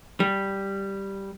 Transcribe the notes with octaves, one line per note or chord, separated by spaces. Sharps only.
G3